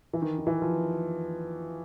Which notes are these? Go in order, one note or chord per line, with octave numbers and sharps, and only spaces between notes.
E3
D#3
D#3
E3
F3